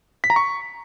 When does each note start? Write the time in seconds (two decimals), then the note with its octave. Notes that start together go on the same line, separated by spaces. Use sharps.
0.24 B6
0.30 A#5
0.36 C#6